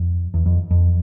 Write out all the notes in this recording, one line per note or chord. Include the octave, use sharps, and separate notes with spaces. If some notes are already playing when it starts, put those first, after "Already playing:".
Already playing: F2
E2
F2
F2